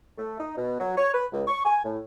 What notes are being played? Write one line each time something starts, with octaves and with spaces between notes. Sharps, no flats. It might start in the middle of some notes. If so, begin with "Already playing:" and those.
A3
D#4
B2
F#3
C#5
B4
C#2
C#6
G#5
A2